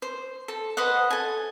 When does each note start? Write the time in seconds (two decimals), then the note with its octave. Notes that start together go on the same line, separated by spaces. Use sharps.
0.02 C5
0.48 A4
0.77 B4 C5 D#5 F#5
1.10 A4 G#5